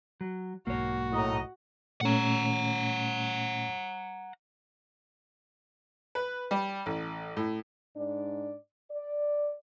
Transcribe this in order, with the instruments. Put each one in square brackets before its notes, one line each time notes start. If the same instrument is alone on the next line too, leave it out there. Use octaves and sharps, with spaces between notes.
[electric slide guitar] F#3
[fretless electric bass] B1 G#2 [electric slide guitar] A#3 C#5 [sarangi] F#4
[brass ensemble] A2 D#5 A#5
[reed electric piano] A#2 A3 C#4 [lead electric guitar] F#5 A#5
[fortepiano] B4
G3
A1
A2
[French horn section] G#2 D4 D5
D5